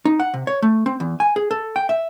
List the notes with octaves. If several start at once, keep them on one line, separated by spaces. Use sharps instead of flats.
D#4
F#5
C3
C#5
A3
C4
E2
G#5
G#4
A4
G5
E5